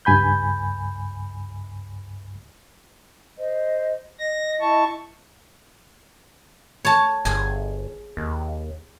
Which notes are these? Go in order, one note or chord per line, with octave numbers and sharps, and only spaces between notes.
C#2 G2 G#5 B5 G6
C5 D#5
D#5 A#6
E4 A5 C#6
C#5 A5
G1 G#4 G#5
D#2